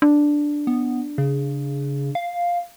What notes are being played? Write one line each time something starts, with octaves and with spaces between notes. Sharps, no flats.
D4
B3
C#3
F5